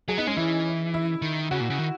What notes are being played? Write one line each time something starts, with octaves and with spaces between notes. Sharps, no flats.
F#3 G#4
B3 D#4
G#3 C#4
E3 E4
E4
D#3
C#3 F#4
A#2
C#3
D#3